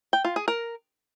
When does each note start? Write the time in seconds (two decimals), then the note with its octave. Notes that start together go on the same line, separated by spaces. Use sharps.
0.13 G5
0.25 F4
0.36 G#4
0.48 A#4